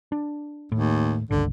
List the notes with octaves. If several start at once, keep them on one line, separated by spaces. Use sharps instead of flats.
D4
D#2 A2
G1 C#2 D3